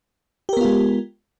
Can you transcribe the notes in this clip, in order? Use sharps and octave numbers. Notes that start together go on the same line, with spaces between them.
G#3 B3 F4 G4 A#4